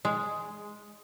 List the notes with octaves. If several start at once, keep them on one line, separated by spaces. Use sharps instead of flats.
G#3